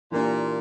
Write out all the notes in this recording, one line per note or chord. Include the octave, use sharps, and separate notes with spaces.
A#2 E3 A#3 D4 G4